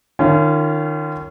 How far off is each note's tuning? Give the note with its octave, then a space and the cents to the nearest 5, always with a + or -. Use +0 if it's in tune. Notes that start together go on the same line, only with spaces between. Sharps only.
D#3 -30 C#4 +0 F4 -35